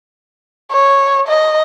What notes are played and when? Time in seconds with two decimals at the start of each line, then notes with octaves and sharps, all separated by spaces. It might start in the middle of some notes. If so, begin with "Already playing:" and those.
0.72 C#5
1.28 D#5